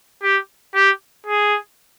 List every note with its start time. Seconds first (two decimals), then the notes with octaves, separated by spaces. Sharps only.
0.23 G4
0.74 G4
1.27 G#4